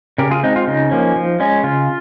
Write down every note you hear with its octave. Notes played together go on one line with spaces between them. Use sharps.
C#3 G4 A#4
F4 G#4
G#3 C4 D#4
F4
C#3 D#4
F3 A#3 C#4
F3
G#3 C#4
C#3 F4